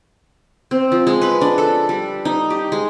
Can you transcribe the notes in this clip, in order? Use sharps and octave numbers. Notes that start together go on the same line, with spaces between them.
C4
F3
G#3
B4
D4
A4
G3
D#4
G4
G#3